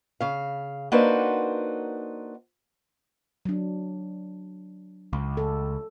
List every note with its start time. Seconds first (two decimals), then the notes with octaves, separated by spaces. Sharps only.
0.21 C#3 F5
0.92 A#3 D4 D#4 F#4 B4 C5
3.45 F#3 D4
5.13 C#2
5.37 A4